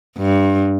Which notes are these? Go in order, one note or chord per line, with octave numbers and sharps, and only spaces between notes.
G2